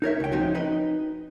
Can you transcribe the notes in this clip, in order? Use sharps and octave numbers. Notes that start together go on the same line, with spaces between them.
D#4 A#4 C#5 E5
C#2 G5
F3 C4 C#4 D#4 F#4
D#4 B4 D#5